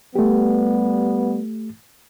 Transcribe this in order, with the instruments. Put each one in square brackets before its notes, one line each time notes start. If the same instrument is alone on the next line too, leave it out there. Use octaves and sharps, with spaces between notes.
[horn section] G3 B3 [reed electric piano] A3 G4